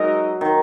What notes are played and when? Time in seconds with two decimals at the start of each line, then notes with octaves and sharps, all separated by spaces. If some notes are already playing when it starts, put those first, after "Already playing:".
Already playing: F#3 G#3 D#4 A#4 D#5
0.41 D#3